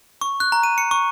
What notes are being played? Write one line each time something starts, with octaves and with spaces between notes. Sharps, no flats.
C#6
F#6
A#5
D#7
C#7
C#6